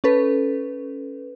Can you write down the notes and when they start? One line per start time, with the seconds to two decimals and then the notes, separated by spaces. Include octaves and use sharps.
0.04 C#4 A4 B4